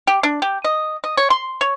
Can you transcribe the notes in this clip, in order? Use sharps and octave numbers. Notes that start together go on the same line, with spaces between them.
G4
D4
G4
D#5
D#5
C#5
C6
C#5